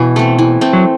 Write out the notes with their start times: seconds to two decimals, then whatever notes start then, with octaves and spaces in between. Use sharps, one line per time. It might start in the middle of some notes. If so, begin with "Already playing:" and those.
Already playing: B2 E3
0.16 A3 C4
0.39 E3
0.61 A3 C4
0.73 F#3